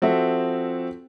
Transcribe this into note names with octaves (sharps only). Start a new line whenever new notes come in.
F3 C4 F#4 A4 E5